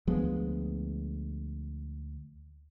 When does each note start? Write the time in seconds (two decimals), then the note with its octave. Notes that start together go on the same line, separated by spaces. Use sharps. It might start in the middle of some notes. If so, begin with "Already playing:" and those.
0.07 D2 F3 G#3 B3